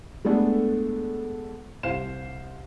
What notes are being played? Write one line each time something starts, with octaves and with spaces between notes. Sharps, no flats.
G#3 A3 B3 D4 A4
C2 C5 F5 E7